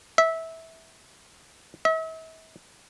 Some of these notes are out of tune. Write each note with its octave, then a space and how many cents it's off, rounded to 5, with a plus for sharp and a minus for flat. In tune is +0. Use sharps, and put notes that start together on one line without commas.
E5 -15
E5 -40